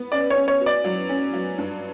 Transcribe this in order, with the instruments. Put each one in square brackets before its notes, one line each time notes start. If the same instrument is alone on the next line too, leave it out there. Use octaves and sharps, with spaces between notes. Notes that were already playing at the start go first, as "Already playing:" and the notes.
Already playing: [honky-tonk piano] B3
[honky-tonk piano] C#4 [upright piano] D5
[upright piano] C#5
[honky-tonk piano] C#4
[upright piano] C#5
[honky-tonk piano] F#4
[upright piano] D5
[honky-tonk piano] F#3
C#4
F#3
G2